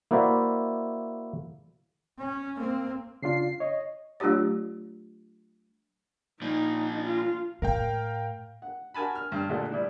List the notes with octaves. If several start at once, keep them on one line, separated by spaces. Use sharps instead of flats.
A#3 E4 F#4 C5 D5 E5
C#4
A#3 C4
C#3 D4 F4 C7
C#5 D#5
F#3 A3 D4 F4 G4 C#5
A#2 F3 D#4
F4
A2 A#4 F5 G5
F#5
F#4 A#4 G#5 A5 B5
F6
G2 F6
A#2 D3 G#3 A3
G3 D4 E4